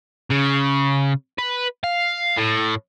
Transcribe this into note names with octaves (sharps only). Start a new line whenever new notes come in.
C#3
B4
F5
A2